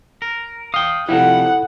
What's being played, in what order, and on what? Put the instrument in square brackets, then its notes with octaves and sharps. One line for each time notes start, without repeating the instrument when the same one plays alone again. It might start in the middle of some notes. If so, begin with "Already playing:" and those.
[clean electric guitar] A#4
[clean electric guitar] F5 G5 [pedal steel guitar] D#6
[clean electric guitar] C3 F3 G3 [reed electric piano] E4 A4 [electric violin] F#5